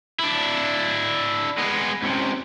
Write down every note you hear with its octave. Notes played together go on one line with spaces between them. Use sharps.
D4 E4
G#3 B3
C#2 C3